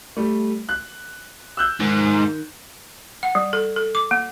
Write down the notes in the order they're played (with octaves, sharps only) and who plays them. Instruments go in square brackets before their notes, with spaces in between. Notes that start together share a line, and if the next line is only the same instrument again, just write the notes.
[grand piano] G3 A3
F#6
E6 F#6 G6
[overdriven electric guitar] G#2 [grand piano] D#3
[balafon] F#5
G3
A4
A4
D6
A#3